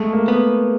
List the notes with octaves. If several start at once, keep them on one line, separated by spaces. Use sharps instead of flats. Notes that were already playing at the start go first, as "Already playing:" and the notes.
Already playing: G#3 A3
A#3
B3